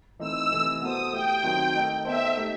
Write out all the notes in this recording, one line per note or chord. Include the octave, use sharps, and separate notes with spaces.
E3 A3 C4 D#4 E6
C3 E3 A3
B3 F#4 A4 C5 D#6
A3 E4 G4 G5
D#3 F#3 C4
A3 D#4 A4 D#5
B3 D#4 A4 C5 E5
A3 D#4 G4